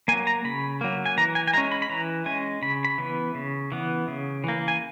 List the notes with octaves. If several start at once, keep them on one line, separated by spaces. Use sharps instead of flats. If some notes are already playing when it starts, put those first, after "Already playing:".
F#3 A#3 G#5
A#5
C#3 B5
F#3 A#3
G#5
E3 A#5
G#5
G#5
G#3 C#4 A#5
B5
B5
E3 A#5
G#3 C#4 G#5
C#3 B5
B5
E3 B3
C#3
E3 B3
C#3
E3 A#3
G#5